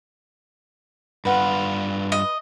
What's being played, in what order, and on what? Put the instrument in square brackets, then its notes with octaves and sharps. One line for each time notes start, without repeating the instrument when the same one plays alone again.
[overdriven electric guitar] G2 F4 [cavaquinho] B4 F#5
[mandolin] D#5